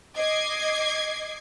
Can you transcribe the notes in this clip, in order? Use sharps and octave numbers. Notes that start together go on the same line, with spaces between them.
D#5 D6 G#6 C7